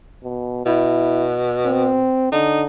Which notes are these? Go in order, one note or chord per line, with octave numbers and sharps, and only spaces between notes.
B2
B2 E4
C4
D3 D#4